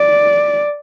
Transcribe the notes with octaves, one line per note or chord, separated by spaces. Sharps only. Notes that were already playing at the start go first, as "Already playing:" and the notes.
Already playing: D5